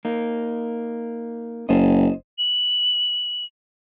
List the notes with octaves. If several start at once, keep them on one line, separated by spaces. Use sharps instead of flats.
A#3 D#4
F#1 C5 D#5
F#7